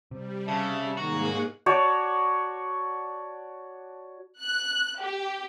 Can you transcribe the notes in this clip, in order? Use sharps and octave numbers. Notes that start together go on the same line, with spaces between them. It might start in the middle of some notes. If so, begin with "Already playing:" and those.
C3 G3
C#3 E5 A5
G#2 D#3 A#3 F#4 G#4 A#5
F#4 C#5 D5 A5
F#6
G4